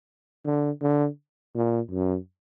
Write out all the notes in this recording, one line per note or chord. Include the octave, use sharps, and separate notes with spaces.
D3
D3
A#2
F#2